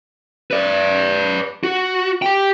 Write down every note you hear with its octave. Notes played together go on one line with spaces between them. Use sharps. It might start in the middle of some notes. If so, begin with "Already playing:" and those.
B4 D5
F#4
G4 G5